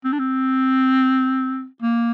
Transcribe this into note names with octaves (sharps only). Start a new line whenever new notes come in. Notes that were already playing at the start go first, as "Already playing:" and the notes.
C4
D4
C4
A#3